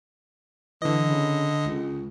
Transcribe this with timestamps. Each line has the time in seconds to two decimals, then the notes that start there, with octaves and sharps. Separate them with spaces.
0.82 D3 E3 D#5
1.09 C#3
1.66 C#2